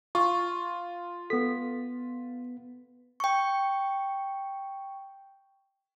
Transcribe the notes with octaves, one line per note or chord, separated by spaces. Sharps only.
F4 C#6
B3 A4 B6
G5 C#6